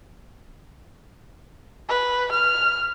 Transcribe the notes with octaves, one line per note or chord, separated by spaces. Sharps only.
B4
F6